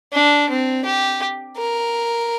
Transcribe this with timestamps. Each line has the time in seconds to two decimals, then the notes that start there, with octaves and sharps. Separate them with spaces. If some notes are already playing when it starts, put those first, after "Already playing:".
0.13 D4
0.50 C4
0.85 G4
1.57 A#4